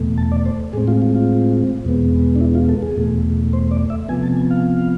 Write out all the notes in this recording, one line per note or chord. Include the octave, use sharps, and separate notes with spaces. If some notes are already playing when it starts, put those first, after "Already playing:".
Already playing: E2 B2 A3
A5
D5
C5
A2 G#3 C4 G#4
F4
F4
F4
E2 B2 G#3 B3
D4
E4
F4
A4
G#4
E2 B2 A3
C5
D5
E5
C3 F3 B3 G#5
A5
G#5
F5